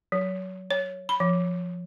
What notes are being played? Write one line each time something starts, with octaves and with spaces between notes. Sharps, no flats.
F#3
C#5
B5
F3